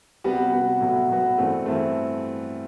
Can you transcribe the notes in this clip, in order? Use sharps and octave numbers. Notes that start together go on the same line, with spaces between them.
C3 G3 B3 F#4
C3 G3 B3 F#4
A2 F#3 B3 F#4
A2 F#3 B3 F#4
G2 E3 A3 C4
G2 E3 A3 C4